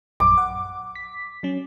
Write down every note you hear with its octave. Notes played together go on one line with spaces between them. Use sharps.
A#1 F#2 D6
F#5
B6
F#3 C#4